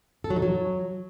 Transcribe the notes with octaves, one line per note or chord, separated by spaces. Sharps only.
A4
F#3
D#4
F#3